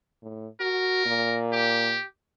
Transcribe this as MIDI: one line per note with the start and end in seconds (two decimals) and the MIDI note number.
0.23 0.47 45
0.61 1.01 66
0.61 1.39 70
1.06 1.97 46
1.53 2.04 67